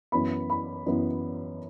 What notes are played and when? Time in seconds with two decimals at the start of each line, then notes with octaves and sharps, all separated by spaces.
0.12 F#2 E3 B3 B5
0.50 B5
0.86 F#2 E3 B3